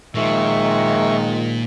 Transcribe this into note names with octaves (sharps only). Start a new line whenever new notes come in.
A#2 D#3 F3 G#3 E5 C#6